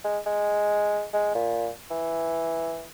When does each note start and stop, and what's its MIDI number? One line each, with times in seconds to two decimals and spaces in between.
0.04 0.19 56
0.26 1.05 56
1.13 1.30 56
1.35 1.69 46
1.90 2.84 52